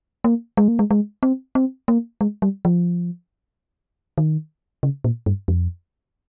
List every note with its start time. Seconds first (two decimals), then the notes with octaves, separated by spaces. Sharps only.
0.24 A#3
0.57 G#3
0.68 A#3
0.79 G#3
0.91 G#3
1.23 C4
1.55 C4
1.88 A#3
2.21 G#3
2.42 G3
2.65 F3
4.18 D#3
4.83 C#3
5.04 A#2
5.26 G2
5.48 F2